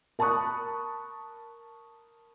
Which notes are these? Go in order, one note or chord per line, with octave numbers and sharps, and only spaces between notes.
A#4 A5 B5 C#6 D#6 F#6